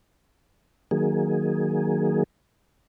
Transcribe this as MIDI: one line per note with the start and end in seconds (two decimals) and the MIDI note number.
0.91 2.24 51
0.91 2.24 54
0.91 2.24 58
0.91 2.24 68